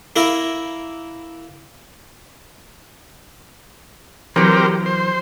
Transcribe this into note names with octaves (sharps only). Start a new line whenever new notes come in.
A#3 E4 A#4
E3 F#3 C4 G4 A#4
C5